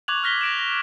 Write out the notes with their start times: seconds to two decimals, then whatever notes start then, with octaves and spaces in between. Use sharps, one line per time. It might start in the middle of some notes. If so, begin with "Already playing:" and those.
0.08 C#6 D6 F#6 G#6 F7 F#7
0.23 F6 F#6 A#6 B6 G7
0.41 A#6 D7 E7
0.59 A#6